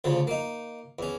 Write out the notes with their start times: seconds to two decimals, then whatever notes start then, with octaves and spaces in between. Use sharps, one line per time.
0.04 D2 C#3 F3
0.27 A#3 D#4
0.99 E2 C#4